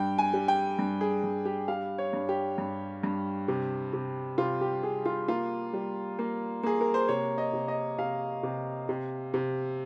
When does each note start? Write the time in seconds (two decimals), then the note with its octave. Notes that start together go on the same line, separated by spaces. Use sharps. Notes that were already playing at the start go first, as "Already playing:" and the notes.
Already playing: G2 G5
0.18 G#5
0.34 G3
0.48 G5
0.79 G2
1.01 G#4
1.24 G2
1.45 G4
1.68 G3 F5
1.98 C#5
2.13 G2
2.29 G4
2.58 G2
3.03 G2
3.48 C3
3.93 C3
4.38 C3 F4
4.61 G4
4.83 C3 G#4
5.06 F4
5.28 A#3 F4
5.73 G3
6.19 A#3
6.63 A#3 G#4
6.81 A#4
6.94 C5
7.08 C3 C#5
7.38 D#5
7.53 C3
7.68 D#5
7.99 C3 F5
8.43 C3
8.89 C3
9.34 C3